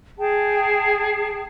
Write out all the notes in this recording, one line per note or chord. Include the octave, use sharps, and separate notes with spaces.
G#4 G5 A5